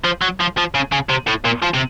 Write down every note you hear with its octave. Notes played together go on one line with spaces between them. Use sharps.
F3
F#3
F3
F3
C#3
C#3
C3
A2
A#2
F3
C3